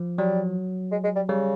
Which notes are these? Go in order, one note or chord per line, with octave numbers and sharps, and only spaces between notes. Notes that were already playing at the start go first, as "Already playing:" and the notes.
Already playing: F3
F#3 G3
G#3
G#3
G3
C#3 G3